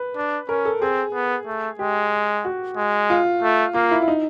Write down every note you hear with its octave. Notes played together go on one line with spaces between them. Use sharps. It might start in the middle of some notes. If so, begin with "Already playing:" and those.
Already playing: B4
D4
C#4 A#4
A4
C4 G#4
B3
A3
G#3 G4
F#4
G#3
F4
A3
A#3 F4
E4
E4
D#4